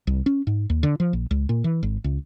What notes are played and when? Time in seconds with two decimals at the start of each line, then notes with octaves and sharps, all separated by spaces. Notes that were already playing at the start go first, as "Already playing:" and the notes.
0.07 C2
0.26 C#4
0.47 G#2
0.70 D#2
0.83 D3
1.00 F3
1.13 A#1
1.31 C#2
1.49 A#2
1.64 E3
1.83 G#1
2.04 C#2